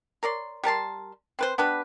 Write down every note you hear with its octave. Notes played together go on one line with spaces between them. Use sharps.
A#4 C#5 D5 C6
G3 A#4 A5 C6
C4 B4 C5
B3 D4 G4 B4